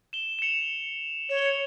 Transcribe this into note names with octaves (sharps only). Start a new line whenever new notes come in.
E7 G7
E7
C#7 F7
C#5 F7
G7
C#7 F7